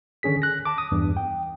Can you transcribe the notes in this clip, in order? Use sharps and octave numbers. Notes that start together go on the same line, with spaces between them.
D3 D#3 C#4 G#4 B6
F#6 A#6
A5 D6
D#6
E2 G2 E3
G5